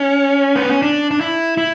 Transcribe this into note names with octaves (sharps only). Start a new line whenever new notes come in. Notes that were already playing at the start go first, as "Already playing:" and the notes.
Already playing: C#4
B3
C#4
D4
D4
E4
E4